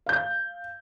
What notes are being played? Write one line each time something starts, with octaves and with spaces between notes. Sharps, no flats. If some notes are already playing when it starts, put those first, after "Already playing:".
F5 G6